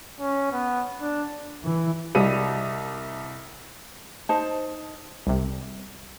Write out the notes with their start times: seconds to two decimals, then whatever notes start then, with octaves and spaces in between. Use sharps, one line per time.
0.20 C#4
0.52 B3
1.01 D4
1.63 E3
2.15 C2 G3 D#5 D#7
4.29 D#4 C5 A5
5.27 C2 C3